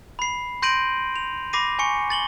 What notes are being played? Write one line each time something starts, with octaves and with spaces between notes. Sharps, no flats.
B5 C7
C6 G6 A#6 D7 D#7 F#7
F7
B5 D6 A#6 C7 D#7
G#5 C#6 C#7
A6 F#7 G7